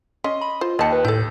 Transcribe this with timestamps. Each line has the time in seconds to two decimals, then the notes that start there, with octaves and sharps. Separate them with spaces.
0.24 C#4 D#5 C6
0.41 B5
0.61 F4 C5
0.79 D#2 F3 D#5 G5 A5 C#7
0.92 B4
1.05 A2 E4 A4 G6